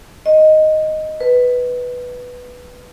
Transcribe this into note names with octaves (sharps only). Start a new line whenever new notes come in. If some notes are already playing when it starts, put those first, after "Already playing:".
D#5
B4